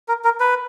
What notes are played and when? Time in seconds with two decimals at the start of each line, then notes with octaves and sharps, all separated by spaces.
0.08 A#4
0.24 A#4
0.40 B4